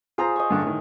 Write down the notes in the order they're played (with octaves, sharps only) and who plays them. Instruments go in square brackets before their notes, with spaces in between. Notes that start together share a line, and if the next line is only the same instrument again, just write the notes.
[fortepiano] F4 A#5 [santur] G#4 C5
[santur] D#5 C#6
[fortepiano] G2 D3
A2 D#3